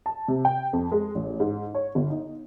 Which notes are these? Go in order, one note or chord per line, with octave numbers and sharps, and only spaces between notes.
A5
C3
G5
F2
G#3
A1
G#2
C#5
G1
D#4